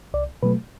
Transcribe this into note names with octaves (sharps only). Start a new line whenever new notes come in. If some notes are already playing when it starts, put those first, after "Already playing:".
C2 D5
B2 F#3 A3 B4